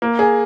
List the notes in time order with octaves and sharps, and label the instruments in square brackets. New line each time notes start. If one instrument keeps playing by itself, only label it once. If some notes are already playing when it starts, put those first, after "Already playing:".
[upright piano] A#3
G#4